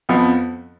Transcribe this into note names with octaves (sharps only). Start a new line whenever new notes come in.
F2 F3 B3